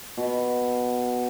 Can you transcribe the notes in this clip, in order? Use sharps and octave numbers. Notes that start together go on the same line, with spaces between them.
B2